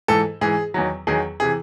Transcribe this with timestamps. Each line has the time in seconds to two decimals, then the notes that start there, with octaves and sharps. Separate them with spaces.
0.08 G#2 E3 A4
0.41 G#2 E3 G#4
0.74 E2 D#3 F#3
1.07 E2 D#3 F#3 G#4
1.40 C3 E3 G#4